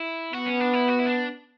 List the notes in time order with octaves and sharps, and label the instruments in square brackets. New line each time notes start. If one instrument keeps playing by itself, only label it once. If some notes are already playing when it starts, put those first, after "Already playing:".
Already playing: [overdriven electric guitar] E4
[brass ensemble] B3 [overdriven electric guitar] F#4
[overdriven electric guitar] C#4
D4
E4
F#4
E4
D4